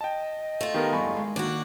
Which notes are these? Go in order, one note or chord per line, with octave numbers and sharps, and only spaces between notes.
D#5 G5 A5
A3 F4
D#3 B3 G4 A#4
E2 G2 E3 G#5 B5 C#6
G#3
D#3 A#3 D4 F#4